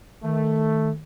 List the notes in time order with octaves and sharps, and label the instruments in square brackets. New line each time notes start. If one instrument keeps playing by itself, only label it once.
[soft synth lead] D#3 [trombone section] A3